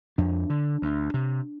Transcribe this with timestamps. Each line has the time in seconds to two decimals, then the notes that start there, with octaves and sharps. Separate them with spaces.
0.18 F2 D4
0.50 D3
0.82 D2
1.14 C3